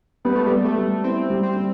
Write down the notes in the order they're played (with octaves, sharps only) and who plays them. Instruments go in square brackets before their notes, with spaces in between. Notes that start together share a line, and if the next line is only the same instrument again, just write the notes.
[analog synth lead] G3 [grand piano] B3
[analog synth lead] A3
[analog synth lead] G3 [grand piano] B3
[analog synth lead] A3
[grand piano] G3
[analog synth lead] C4 [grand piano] E4
[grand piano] G3
[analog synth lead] C4
[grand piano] G3